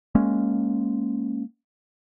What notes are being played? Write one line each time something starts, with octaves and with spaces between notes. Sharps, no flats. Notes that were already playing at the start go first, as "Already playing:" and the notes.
G#3 A#3 C#4